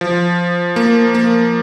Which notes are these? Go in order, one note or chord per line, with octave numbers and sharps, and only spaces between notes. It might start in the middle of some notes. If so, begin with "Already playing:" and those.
F3
A#3
A#3